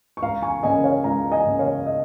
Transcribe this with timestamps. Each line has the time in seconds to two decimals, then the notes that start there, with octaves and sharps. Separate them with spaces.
0.17 C#6
0.22 C#2 F5 A#5
0.42 G#5 C#6
0.63 C#3 A#3 C#4 D#5 G#5
0.84 C#5 F5
1.04 C#2 F5 A#5
1.32 D#5 G#5
1.46 C#3 A#3 C#4
1.59 C#5 F5
1.86 D#5